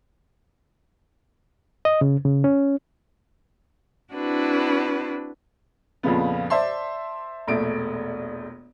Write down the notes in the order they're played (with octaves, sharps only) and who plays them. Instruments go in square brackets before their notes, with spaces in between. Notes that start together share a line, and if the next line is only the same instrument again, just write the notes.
[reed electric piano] D#5
C#3
C#3
C#4
[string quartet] C4 D4 E4 F#4 B4
[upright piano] F2 A#2 C#3 F3 B3
C5 D5 E5 A5 C6
E1 A#1 A3 D7